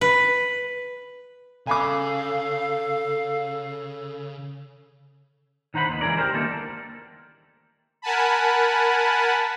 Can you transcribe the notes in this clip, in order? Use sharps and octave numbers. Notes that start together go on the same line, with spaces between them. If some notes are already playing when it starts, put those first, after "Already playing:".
B4
C#3 A4 F5 G#5 B5 D6
D#3 D#4 C5 F#5 B5
D#2 B3
C#2 E3 A3 G#4 A#4 D5
G4 A4 A#4 C5
D3 D#3 G3 A3 A#3 A4
A#4 F#5 G#5 A5 B5